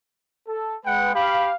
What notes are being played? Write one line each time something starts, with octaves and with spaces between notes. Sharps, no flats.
A4
G#3 B4 F#5 G5
G4 F5 B5